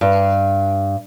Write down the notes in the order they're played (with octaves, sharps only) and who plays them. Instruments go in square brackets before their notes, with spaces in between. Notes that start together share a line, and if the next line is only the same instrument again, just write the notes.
[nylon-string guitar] G2